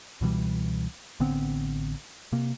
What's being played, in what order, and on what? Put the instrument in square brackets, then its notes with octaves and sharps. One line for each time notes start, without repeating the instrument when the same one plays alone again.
[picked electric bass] C#2 B2 E3 G3
A1 D3 B3 C4
C3 A#3